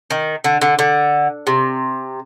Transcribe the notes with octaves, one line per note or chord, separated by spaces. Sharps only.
D#3
D3
D3
D3
C3